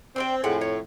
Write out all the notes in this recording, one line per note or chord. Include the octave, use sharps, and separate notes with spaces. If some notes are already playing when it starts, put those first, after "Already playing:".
C4 D4 C5 G5
F2 A2 G#3 C4 F#5
C#5